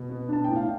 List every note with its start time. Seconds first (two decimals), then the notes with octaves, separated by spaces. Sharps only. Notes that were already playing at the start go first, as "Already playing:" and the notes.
Already playing: B2
0.10 B3
0.29 D4 A5
0.44 A2 G5
0.56 F5